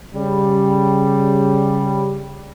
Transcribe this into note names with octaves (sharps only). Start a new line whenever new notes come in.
C#3 G3